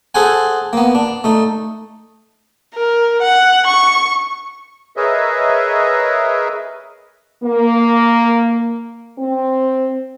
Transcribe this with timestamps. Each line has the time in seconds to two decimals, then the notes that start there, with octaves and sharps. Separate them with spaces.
0.15 G#4 A4 C5 F#5 G#5
0.73 A#3 B3
0.95 D4
1.24 A3 D#4
2.74 A#4
3.22 F#5
3.66 C#6
4.97 G#4 A#4 B4 C#5 D#5 E5
7.44 A#3
9.19 C4